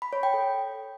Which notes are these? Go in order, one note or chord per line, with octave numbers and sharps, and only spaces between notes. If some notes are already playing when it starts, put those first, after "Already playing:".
B5
C#5
G5
A4